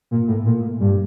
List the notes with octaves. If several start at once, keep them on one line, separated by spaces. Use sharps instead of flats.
A#2
A2
A#2
G2